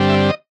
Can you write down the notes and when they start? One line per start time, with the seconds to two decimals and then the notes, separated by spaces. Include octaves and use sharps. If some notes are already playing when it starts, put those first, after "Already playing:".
Already playing: G2 D3 G3 C4
0.09 E5
0.29 D#5